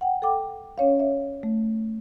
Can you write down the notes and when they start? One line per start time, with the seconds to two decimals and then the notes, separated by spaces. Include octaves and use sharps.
0.01 F#5 G5
0.22 A4 F#5 G5 D6
0.78 C#4 C#5 F5
0.99 C#5 E5
1.43 A3